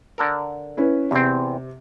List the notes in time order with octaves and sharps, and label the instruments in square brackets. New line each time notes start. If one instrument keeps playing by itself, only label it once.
[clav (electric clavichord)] D3 A4 A#4
[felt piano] C#4 E4 B4
[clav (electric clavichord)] E2 C4 [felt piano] C3